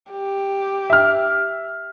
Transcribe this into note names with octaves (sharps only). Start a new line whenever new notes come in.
G4
E5 F6